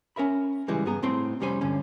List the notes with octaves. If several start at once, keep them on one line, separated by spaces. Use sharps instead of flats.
C#4 A#4 E5 B5
C#2 A#2 E3 G3 G#3
G2 B3 G#4 A#5
A2 C4 C6
C2 F2 G3 C#4 C5 G#5
D2 G2 D3 C#4